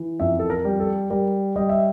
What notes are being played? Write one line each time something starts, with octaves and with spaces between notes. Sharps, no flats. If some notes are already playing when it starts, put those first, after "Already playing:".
Already playing: E3
F2 E5
A4
A#4
G3
A4
G3 A#4
G3 D#5
E5